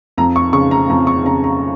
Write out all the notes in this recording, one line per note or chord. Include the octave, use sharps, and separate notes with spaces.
F2 A#5
C#6
C#3 C#6
A#5
F2 A#5
C#6
C#3 A#5
A#5